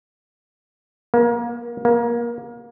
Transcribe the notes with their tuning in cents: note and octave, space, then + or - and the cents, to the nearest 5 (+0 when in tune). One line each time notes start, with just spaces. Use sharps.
A#3 +30
A#3 +25